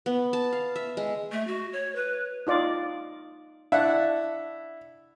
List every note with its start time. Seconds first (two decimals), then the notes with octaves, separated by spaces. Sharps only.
0.06 B3
0.33 A5
0.52 F5
0.76 E5
0.97 G#3
1.32 A3
1.47 F#4
1.73 C#5
1.95 B4
2.47 D#4 F4 D5
3.72 D4 E4 F#5